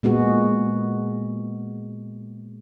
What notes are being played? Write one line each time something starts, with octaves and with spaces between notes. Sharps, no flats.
A#2 G#3 B3 F#4